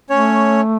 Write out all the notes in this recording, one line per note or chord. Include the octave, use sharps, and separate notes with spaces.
A3 C#4 C#5